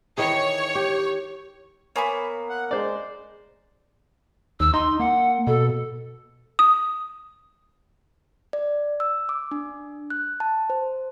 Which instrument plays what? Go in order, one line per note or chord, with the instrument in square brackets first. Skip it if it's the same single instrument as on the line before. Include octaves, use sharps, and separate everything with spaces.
[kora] D#3 E3 G#4 [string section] C#5
[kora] G4
[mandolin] A#3 B3 [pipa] C#5 G#5 B5
[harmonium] F#5
[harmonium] G#3 [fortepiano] C5 D5
[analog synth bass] D#2 [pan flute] E6
[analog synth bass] D#4 [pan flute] C6
[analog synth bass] A#3 [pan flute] F#5
[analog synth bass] B2 [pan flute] A4
[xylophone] D#6
[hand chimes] D5
E6
D6
D4
F#6
A5
C5